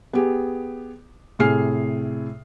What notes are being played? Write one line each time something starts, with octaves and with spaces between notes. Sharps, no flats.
B3 G4 G#4
A2 C3 G#4 F6 C7